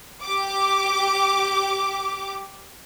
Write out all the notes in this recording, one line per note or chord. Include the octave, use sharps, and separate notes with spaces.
G4 D6